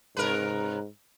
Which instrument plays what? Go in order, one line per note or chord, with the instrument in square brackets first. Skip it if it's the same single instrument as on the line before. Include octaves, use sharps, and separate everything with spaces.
[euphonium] G#2 [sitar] C3 A#4 B4